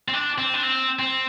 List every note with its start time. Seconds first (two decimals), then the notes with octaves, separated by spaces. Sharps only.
0.08 C4
0.14 D4
0.38 C4
0.54 D4
0.63 C4
0.99 C4